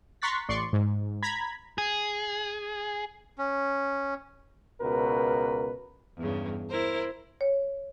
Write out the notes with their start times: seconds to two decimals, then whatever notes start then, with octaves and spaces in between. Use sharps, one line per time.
0.22 A#5 C6 C#6 F#6 A6 B6
0.49 A1 D5 C6 C#6
0.73 G#2
1.22 A#5 B5 G#6 B6
1.78 G#4
3.38 C#4
4.81 C#2 B2 A#4 B4
6.18 E2 G2 C#3
6.68 E4 A#4 C5
7.41 C#5